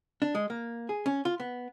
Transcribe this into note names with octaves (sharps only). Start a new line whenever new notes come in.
D4
G#3
A#3
G#4
C#4
F4
B3